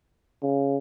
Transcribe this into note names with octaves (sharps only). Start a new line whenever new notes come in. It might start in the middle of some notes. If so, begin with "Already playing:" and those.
C#3